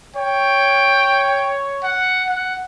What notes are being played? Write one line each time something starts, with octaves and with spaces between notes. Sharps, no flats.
C#5 G5
F#5
F#5